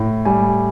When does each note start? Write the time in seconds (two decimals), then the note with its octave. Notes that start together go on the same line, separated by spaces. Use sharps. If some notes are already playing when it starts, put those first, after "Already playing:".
Already playing: A2
0.25 G3 G#5